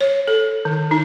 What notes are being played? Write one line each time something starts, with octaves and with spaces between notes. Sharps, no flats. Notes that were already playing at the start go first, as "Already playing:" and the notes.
C#5
A4
D#3
D#4